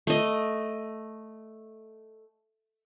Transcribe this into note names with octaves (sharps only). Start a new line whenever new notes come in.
A3 D#5